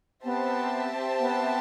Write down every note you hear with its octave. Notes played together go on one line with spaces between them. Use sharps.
B3 C4 G4 C5 E5 A5
B3